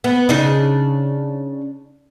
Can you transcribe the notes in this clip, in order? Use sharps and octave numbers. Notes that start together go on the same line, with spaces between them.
B3
C#3 D4 D#4